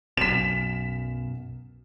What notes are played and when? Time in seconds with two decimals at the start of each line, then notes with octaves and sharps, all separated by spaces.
0.17 B1 F#2 B2 B6 E7